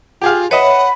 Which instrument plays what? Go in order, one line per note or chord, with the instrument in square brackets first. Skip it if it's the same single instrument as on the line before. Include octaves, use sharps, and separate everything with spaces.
[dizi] F4 [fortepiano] G4 G#4 F5
[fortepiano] B4 D#5 [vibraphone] C#5 E5 [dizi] F#5 [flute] B5